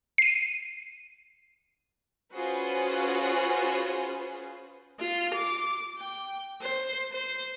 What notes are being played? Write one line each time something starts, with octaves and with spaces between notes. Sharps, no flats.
C7 D#7
C#4 F4 F#4 G#4 B4 C5
F4
D6
G5
C5
C5